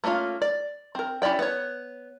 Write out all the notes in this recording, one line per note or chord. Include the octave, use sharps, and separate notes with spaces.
A3 A#3 C#4 F4 F5
D5
C4 A#4
C#4 E4 G4 D5 G5
B3 C#5